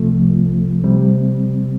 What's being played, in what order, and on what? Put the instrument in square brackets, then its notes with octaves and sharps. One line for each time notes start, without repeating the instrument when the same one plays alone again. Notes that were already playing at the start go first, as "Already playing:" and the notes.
Already playing: [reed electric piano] C2 C3 F3 A3
C3 G3 C4